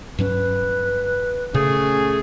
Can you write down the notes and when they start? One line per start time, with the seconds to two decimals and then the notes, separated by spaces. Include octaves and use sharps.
0.19 G2 F#3 C#4 B4
1.54 A#2 C#3 A3 C#4 G#4